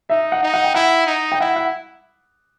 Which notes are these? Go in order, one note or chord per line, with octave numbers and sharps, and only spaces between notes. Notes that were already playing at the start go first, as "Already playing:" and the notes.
D#4 E5
F#5
D#4
F#5
G5
E4 F#5
D#4
G5
E4 F#5
F#5